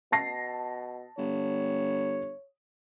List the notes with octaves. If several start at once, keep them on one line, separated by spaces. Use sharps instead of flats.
B2 A5 A#6 C7
G1 C#5